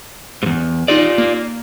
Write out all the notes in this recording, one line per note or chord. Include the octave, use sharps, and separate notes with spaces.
E2 G#2
D#4 F4 G4 G#4 D5
A#3